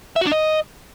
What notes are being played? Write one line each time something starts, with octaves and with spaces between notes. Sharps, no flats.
E5
F#4
D4
D#5